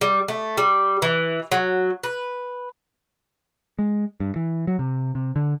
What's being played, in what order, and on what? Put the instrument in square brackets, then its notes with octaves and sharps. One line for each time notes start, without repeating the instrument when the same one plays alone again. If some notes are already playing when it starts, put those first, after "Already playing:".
[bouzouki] G3
A3
G3
E3
F#3
B4
[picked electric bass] G#3
G2
E3
F#3
C3
C3
D3